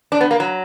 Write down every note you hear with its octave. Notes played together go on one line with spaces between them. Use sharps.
D4
B3
A#3
F#3